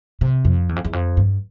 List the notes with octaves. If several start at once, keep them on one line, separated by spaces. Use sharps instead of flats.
C3
F2
E2
F2
E2
F2
G2